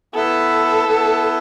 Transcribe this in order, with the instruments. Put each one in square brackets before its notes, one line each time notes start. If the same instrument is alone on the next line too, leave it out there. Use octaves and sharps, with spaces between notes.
[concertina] B3 E4 B4 E5 [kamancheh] A4
[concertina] B3 E4 B4 E5